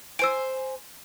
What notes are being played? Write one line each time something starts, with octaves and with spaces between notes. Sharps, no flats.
C5 G#5 E6 D7